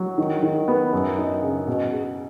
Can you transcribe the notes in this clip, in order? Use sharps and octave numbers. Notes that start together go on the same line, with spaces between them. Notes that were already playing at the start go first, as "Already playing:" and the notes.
Already playing: F#3
D#3
D#3
B3
F#2
D#4
C#3
B2
G#4